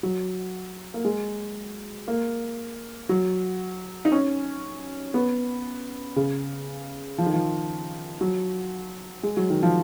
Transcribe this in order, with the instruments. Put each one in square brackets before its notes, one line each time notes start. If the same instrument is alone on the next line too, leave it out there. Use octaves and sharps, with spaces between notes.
[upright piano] F#3
A#3
G#3
A#3
F#3
D#4
C#4
B3
C#3
F3
D#3
F3
F#3
G#3
F#3
D#3
F3